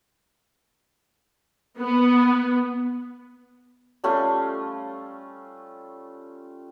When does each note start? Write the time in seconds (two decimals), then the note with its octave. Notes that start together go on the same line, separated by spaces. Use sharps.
1.79 B3
4.04 G3 A3 C#4 F4